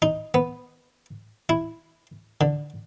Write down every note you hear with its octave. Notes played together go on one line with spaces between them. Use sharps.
D#4
B3
E4
D3